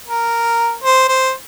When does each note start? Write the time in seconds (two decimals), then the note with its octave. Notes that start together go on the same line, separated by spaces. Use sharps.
0.07 A#4
0.84 C5
1.08 C5